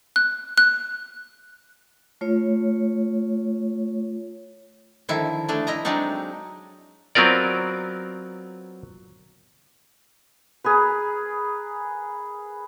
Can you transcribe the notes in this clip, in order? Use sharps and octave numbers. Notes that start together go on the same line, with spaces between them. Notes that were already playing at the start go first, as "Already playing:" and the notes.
F#6
F#6
A3 F4 C#5
D3 D#3 F3 E4
A3 D4 G#4
E4 D#5 A#5
F#3 G#3 C4 D4 D#4
F#3 B3 C4 F4 A#4 D5
G#4 A#4 B4